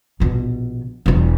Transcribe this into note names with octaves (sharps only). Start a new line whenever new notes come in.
A#1 B2
E1 E2